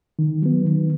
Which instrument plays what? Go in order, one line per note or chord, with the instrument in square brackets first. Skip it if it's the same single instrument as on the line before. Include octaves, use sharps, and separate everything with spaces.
[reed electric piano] D#3
F#3 B3
D#3